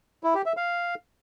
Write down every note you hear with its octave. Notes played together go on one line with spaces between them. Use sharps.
E4
G4
E5
F5